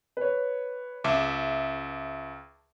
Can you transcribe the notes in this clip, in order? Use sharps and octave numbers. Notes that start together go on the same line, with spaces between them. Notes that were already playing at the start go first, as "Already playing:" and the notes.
B4 C#5
C#2 E5 A5 D6